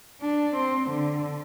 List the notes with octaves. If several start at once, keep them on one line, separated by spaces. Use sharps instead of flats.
D4
C4
D3